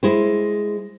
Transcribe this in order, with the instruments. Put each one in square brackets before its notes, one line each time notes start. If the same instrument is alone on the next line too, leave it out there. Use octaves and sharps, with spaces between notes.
[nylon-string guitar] G#3 E4 C5